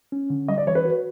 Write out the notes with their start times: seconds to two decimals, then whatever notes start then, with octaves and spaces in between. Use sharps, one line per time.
0.12 C#4
0.30 D3
0.48 G3 D#5
0.58 D5
0.66 E3 C#5
0.75 B4
0.85 F#4